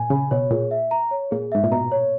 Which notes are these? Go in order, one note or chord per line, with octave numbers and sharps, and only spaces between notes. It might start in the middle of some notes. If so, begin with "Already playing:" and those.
Already playing: A#2 G#5
C#3 B5
B2 C#5
A#2 G#4
E5
A#5
C#5
A#2 G#4
G#2 E5
A#2
B2 A#5
C#5